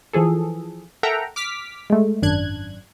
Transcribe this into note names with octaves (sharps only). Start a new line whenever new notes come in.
E3 F3 G#4 A4
A4 A#4 E5 F#5 G5 A#5
D6 F6 B6
G#3 A3
G#1 F#2 D4 F#6 G#6